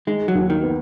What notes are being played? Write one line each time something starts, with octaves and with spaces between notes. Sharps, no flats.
D#3 G#3
F#3
D#2
D#3
B3